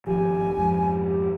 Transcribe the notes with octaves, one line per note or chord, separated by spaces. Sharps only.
G#1 G2 F3 G4 G#5
F2 G#2 F3